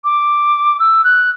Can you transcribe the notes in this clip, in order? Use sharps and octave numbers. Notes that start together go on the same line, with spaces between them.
D6
E6
F#6